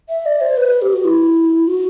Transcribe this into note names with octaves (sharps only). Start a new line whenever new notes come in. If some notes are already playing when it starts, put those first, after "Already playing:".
E5
D5
C5
B4
G4
F#4
E4
F#4